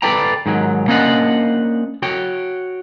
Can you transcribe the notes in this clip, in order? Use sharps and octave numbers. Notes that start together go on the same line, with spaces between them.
A4 B4 D5 G5 A#5
G#2 D#3 F#3
A#3 C#4 D4 C5 D#5 F#5
F#4 C#5 G5